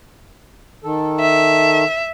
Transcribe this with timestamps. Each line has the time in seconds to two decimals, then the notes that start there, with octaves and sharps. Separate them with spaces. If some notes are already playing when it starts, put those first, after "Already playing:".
0.84 D#3 A4
1.20 E5